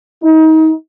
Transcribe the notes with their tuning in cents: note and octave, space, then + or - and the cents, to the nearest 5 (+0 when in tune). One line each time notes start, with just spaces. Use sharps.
D#4 +30